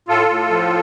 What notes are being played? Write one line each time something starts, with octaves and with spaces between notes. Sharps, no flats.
A2 F4 A4
A2
F3